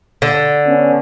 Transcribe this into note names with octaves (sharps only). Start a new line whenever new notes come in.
D3
B3 C#4